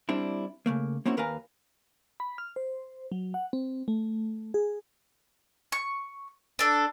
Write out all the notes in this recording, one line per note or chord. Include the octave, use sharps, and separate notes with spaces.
G3 C4 D4 E4
C#3 A3 A#3
A#3 C4 C#4 E4 F#4
D#2 A#4 B4 F5 G#5 A#5
B5
F6
C5
F#3
F#5
C4
A3
G#4
C#6
D4 A4